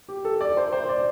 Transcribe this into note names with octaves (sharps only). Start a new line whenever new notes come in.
G4
A4
D5
C5
C5
D5